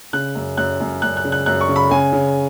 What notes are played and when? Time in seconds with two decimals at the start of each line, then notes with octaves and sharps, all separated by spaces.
0.13 C#3 F#6
0.35 F#2
0.57 F#2 F#6
0.81 F#2
1.02 F#2 F#6
1.17 F#6
1.24 C#3
1.32 F#6
1.46 F#2 F#6
1.61 C#6
1.68 C#3
1.76 B5
1.90 C#3 G#5
2.13 C#3